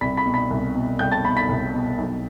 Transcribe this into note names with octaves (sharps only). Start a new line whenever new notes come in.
C2 B5 B6
B5 B6
B2
B5 B6
C2
B2
C2 G5 G6
A5 A6
B2 B5 B6
B5 B6
C2
B2
B1